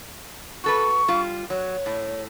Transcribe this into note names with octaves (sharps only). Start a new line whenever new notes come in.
F#4 A4 B4 C#6
G3 F4
F#3 C#5
A2